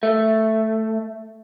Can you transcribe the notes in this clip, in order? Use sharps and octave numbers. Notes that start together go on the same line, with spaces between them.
A3